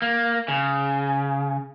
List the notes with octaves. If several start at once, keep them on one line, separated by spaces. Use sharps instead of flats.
A#3
C#3